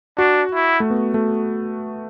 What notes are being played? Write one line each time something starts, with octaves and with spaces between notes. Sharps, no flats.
D4 F#4
E4
A3
B3
A3